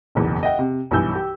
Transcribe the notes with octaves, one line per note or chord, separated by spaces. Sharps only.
F#1 B1 E2
D#5 E5 F#5 G5
C3
B1 G2 E3 G#5 E6 G6
G4